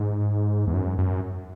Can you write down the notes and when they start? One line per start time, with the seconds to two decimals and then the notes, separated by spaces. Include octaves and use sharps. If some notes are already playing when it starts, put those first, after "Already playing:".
Already playing: G#2
0.67 E2
0.74 F#2
0.98 F#2